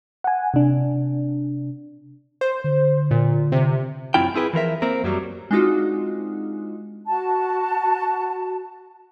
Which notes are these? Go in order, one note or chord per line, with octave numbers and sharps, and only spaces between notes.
F#5 G#5
C3 D4
C5
D3
A#2
C3
F#2 C4 E4 F4 G5
C4 E4 G#4 B4
E3 F3 A#4 E5
A#3 C4 A#4
F#2 F#3 G3
G#3 C4 D4 D#4 F4 F#4
F#4 A5